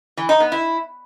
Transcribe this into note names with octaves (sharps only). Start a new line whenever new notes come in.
E3
D#4
B3
E4